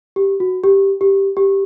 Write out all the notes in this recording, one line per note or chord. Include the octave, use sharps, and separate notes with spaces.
G4
F#4
G4
G4
G4